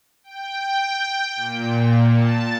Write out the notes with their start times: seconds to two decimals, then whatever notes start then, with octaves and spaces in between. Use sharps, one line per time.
0.24 G5
1.36 A#2
2.14 A5